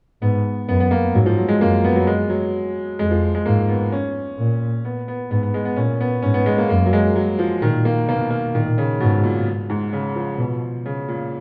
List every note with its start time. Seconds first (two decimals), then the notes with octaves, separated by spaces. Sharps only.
0.22 G#2 B3
0.68 F#2 B3
0.80 B3
0.91 A#3
1.14 G#2 F#3
1.26 F3
1.38 F#3
1.48 G#3
1.60 F#2 A#3
1.84 B3
1.96 F#3
2.07 G#3
2.30 F#3
2.99 F2 G#3
3.11 F3
3.35 G#3
3.46 G#2 A#3
3.68 B3
3.92 C#4
4.38 A#2
4.85 B3
5.08 B3
5.31 G#2 B3
5.43 B3
5.54 G#3
5.65 B3
5.76 A#2 C#4
6.01 B3
6.22 G#2 C#4
6.34 B3
6.46 G#3
6.58 A#3
6.69 F#2 A#3
6.86 F#3
6.93 G#3
7.16 F#3
7.39 F3
7.62 A#2 D#3
7.85 A#3
8.08 B2 A#3
8.30 A#3
8.54 A#2 D#3
8.78 C#3
9.00 G#2 B2
9.24 A#2
9.70 G#2
9.93 C#3
10.16 F3
10.39 B2
10.86 C#3
11.08 A#2